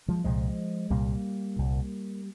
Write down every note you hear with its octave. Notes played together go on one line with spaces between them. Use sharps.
F3 G#3
C2 A#2 F3 G#3
C2 A#2 G3 A#3
C2 A#2